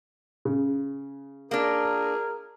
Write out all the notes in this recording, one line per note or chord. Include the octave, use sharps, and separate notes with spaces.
C#3
A#3 D4 G#4 A#4